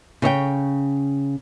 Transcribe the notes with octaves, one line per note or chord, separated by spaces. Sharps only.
C#3 C#5 D#5 G5